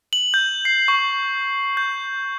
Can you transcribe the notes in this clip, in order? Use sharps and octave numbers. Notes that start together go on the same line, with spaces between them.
F#7
G6
C7
C#6
G6